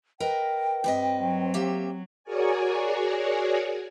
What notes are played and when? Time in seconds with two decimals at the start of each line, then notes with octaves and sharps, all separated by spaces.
0.20 A#4 B4 D#5 G5
0.84 G2 C4 B4 D#5
1.20 F#3
1.54 A#3 G4 E5
2.24 F#4 G#4 A#4 C#5 D5 G#5